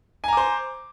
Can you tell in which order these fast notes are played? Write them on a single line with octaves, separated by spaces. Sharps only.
G#5 A#5 D6 C5